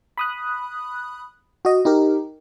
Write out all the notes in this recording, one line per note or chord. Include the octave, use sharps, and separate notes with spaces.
B5 D#6 F#6
F#4 D#5
D#4 G4 A#4